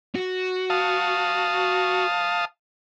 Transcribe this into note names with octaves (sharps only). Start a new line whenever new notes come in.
F#4
F5 A5 D#6